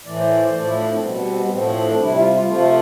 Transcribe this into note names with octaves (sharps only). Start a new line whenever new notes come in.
A2 E3 A3 D5
C5
D5
C5
A2 F3 A3 D5
E4
D4
C4
B2 G3 B3
B3
C4
B3
A2 F3 A3 C4
C4
D4
C3 G3 E4
F4
F4
C3 F3 A3 F4